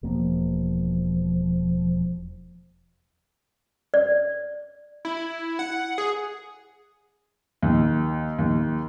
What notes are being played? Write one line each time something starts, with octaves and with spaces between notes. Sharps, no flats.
E1 F3 A#3
D5
E4
F#5
G#4
D#2
D#2